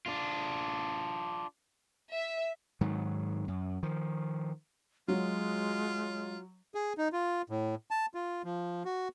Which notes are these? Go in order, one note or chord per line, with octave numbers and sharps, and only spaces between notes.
D4 F4
E5
G#2 D#3 F#3
F#2
D#3 F3
F#3 G#3 F4
G#4
D#4
F4
A2
A5
F4
F3
F#4